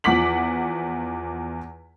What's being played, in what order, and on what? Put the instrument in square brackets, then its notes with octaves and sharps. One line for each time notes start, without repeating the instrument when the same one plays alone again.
[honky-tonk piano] E2 F3 F#5 D6 B6 F#7